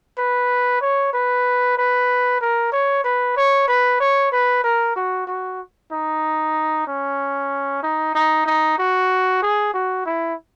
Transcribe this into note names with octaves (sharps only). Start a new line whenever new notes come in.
B4
C#5
B4
B4
A#4
C#5
B4
C#5
B4
C#5
B4
A#4
F#4
F#4
D#4
C#4
D#4
D#4
D#4
F#4
G#4
F#4
E4